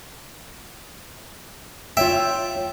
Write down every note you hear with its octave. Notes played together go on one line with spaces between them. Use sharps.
F4 C#5 E5 G5